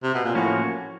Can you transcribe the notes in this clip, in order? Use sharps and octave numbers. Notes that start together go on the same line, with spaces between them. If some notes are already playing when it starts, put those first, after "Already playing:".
C3
B2
A#2
A2 F3 A#3 C#4 F#4